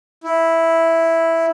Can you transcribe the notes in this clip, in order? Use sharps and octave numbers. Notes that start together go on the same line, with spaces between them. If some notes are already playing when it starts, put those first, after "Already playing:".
E4